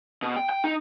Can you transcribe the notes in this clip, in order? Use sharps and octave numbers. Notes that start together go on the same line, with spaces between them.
B2
G5
G5
D#4